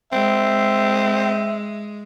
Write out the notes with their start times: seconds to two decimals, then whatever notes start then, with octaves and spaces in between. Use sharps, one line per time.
0.12 G#3 C4 E5